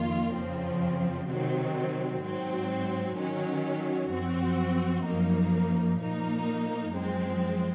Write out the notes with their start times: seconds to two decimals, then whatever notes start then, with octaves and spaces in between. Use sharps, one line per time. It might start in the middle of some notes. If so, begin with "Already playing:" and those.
Already playing: F2 D#3 A#3 F4
0.34 F2 C#3 F3 C4
1.28 C3 D#3 F#3 C4
2.23 G#2 F#3 C4
3.17 D#3 F#3 C#4
4.11 F#2 F3 C4 F#4
5.05 F#2 F3 A#3 D#4
5.99 A#2 F3 A#3 D#4
6.93 F#2 F3 G#3 C4